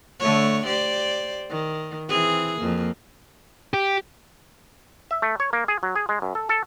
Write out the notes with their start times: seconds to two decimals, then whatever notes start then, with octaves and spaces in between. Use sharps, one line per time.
0.20 D3 A3 C#5
0.66 G4 C5 D5
1.50 D#3
2.09 E3 C4 G#4
2.59 F2 A#3
3.74 G4
5.11 E5
5.22 A3
5.40 C#5
5.53 A#3
5.68 G#4
5.83 F#3
5.96 G#4
6.09 G#3
6.22 F#2
6.35 A4
6.49 A4